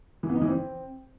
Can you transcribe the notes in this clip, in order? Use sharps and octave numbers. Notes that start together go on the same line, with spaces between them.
E3
B3
D#4
E3
C4